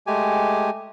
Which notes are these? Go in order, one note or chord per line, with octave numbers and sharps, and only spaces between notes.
G#3 A3 G4 G#5